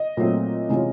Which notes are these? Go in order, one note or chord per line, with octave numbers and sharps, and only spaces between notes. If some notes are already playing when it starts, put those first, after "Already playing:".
Already playing: D#5
A#2 F#3 A3 C4
C3 E3 G#3 C#4 F4